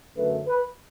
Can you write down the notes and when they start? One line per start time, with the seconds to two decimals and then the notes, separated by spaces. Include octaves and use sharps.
0.15 F#2 D3 A3 B4
0.47 B4